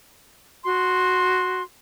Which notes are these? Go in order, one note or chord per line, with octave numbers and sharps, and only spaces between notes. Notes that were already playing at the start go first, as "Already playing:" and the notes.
F#4 C6